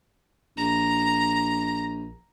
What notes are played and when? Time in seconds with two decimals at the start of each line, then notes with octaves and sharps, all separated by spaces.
0.57 A#1 A#5